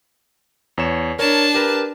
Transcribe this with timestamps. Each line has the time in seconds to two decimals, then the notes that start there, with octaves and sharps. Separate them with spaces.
0.78 E2 C#5 E7
1.19 D4 A#4 C#5 A5
1.54 G4 A#4 B4